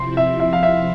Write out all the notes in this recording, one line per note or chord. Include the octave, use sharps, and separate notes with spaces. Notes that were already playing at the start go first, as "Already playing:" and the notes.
Already playing: C3 F3 C4 E4 C6
E5
E5
F5
E5